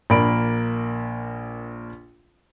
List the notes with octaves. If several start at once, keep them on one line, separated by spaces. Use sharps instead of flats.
A#1 A#3 A#4 B5 D7